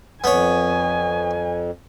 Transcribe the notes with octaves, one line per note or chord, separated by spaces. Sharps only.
F2 B3 C#5 G#5